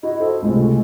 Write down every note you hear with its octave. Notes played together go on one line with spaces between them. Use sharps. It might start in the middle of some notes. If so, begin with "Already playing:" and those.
E4 F#4 D#5
A4 C5 D#5
C#2 A2 C3 G#3